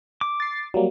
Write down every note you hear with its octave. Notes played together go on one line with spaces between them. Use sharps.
D6
A6 C7
F#3 G3 A#3